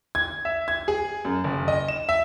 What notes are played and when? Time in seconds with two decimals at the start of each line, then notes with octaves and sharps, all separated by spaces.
0.15 G#6
0.45 E5
0.68 G#6
0.88 G#4
1.25 F#2
1.44 F#1
1.68 D#5
1.88 E7
2.09 E5